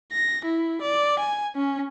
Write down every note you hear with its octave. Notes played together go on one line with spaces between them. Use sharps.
A#6
E4
D5
G#5
C#4